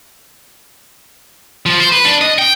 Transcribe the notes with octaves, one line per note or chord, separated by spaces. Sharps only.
F3
C5
B4
D4
D#5
G5